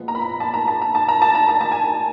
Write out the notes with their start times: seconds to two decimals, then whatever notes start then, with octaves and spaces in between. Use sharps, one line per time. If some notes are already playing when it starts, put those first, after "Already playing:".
Already playing: A#2 F3 G#3 B3
0.08 A#5
0.15 B5
0.22 A#5
0.40 A5
0.54 A#5
0.68 A5
0.82 A#5
0.95 A5
1.09 A#5
1.22 A5
1.35 A#5
1.49 A5
1.61 A5
1.72 G#5